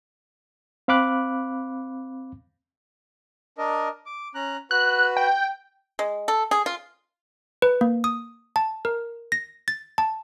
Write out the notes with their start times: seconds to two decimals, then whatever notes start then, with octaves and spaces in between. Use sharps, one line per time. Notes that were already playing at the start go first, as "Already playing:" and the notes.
0.88 C4 F5 B5 D6 F#6
3.58 D4 A#4 D#5
4.06 D6
4.35 C#4 A#5 F#6
4.71 F#4 B4 F#6
5.17 G5
5.99 G#3
6.28 A4
6.51 G#4
6.66 F4
7.62 B4
7.81 A#3
8.04 D#6
8.56 A5
8.85 A#4
9.32 A#6
9.68 A6
9.98 A5